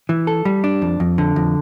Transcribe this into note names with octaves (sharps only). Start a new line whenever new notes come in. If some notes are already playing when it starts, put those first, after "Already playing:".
E3
A4
G3
D4
F2
F2
D3
F2